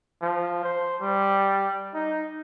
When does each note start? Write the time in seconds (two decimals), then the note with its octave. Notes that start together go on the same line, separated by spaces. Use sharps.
0.22 F3
0.64 C5
1.01 G3
1.94 D#4